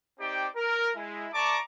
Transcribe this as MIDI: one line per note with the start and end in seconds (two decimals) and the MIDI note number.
0.19 0.47 60
0.19 0.47 63
0.19 0.47 67
0.19 0.47 74
0.19 0.47 79
0.56 0.90 70
0.96 1.27 56
0.96 1.27 64
1.33 1.58 57
1.33 1.58 74
1.33 1.58 81
1.33 1.58 82
1.33 1.58 85
1.33 1.58 86